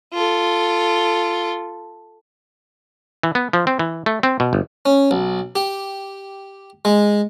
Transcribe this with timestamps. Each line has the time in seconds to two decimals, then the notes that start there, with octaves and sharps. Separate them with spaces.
0.13 F4 A4
3.23 E3
3.35 B3
3.53 F3
3.67 C4
3.79 E3
4.06 A3
4.23 C4
4.40 B2
4.53 G1
4.86 C#4
5.11 B1
5.56 G4
6.85 G#3